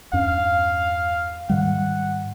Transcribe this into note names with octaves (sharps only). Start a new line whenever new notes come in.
E2 G2 C#4 F5
G#2 D#3 G3 F#5